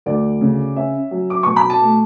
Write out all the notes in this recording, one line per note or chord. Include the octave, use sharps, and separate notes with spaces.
D2 D5
C#3
C#4 E5
F#3
D6
B2 C#6
B5
A5
A3